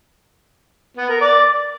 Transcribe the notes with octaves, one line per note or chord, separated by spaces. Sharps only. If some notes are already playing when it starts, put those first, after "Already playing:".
B3
A#4
D5